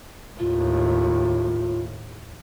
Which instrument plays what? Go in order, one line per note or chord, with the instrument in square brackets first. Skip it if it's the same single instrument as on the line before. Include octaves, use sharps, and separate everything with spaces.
[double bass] D#2 A2 [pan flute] F4